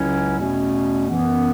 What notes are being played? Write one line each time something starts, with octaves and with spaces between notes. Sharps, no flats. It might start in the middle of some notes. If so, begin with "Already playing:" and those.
Already playing: C#2 C#3 F#3 C#4 E4
E2 B2 A3 C#4
F#2 E3 B3